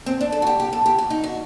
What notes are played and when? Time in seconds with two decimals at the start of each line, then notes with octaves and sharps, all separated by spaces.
0.06 C4
0.21 D4
0.32 A4
0.42 F#4
0.47 G4
0.60 G4
0.73 A4
0.86 G4
0.98 F#4
1.10 D#4
1.24 F#4